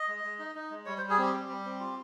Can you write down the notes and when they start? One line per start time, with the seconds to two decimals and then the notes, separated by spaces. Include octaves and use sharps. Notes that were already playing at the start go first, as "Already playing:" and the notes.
Already playing: D#5
0.08 G#3
0.24 G#3
0.39 D#4
0.55 D#4
0.71 G#3
0.86 G3 C#5
0.98 C5
1.02 G3
1.10 G#4
1.18 C4 G4
1.33 G3
1.49 G3
1.65 C4
1.80 F4